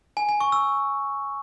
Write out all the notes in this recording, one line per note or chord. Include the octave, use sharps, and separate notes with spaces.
G#5
G#5
C#6
E6